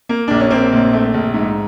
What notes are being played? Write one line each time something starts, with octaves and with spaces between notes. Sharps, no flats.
A#3
A#1 D4
C#4
A#3 C4
A#1
A3
A#1
G#2